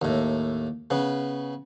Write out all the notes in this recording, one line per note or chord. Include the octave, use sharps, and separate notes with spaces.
D#2 A2
C#3 B3